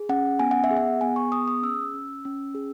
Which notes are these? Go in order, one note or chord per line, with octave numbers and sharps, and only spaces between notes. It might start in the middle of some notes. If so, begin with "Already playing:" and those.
Already playing: G#4
C#4 F#5
B3 G#5
F#5
E5
G#4
F#5
B3 G#5
C#6
G#4 D#6
D#6
C#4 E6
C#4
C#4
G#4